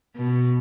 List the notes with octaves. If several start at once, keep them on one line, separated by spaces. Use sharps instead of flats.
B2